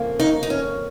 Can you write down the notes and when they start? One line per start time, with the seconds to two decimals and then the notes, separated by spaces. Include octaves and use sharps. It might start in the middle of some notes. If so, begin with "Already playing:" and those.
Already playing: F2 C#3 A#3
0.20 D#4
0.43 D#4
0.50 C#4